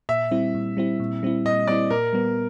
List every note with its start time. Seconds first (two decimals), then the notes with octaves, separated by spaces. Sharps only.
0.09 A#2 E5
0.31 G3 C4 E4
0.55 A#2
0.77 G3 C4 E4
1.00 A#2
1.23 G3 C4 E4
1.45 A#2 D#5
1.68 G3 C4 E4 D5
1.90 A#2 A#4
2.13 G3 B3